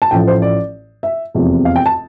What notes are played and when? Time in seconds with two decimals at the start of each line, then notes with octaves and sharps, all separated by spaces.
0.02 A5
0.11 A1 A2 F3 G5
0.27 C5
0.42 D5
1.03 E5
1.34 F1 E2 C3 F3
1.65 F5
1.76 G5
1.86 A5